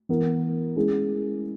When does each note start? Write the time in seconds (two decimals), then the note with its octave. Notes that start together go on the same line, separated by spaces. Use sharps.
0.09 E3 B3 E4 A#4
0.76 G#3 C#4 E4 G#4